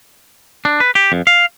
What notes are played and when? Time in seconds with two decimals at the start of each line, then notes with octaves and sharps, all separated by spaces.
0.65 D4
0.80 B4
0.95 G4
1.12 F2
1.27 F5